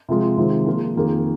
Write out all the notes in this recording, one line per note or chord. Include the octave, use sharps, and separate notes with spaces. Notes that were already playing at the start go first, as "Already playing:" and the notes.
C3 F3 G#3 F4
C3 D#3 G#3 F4
F3 A#3 F4 G#4
F2 D#3 A#3 F4 G#4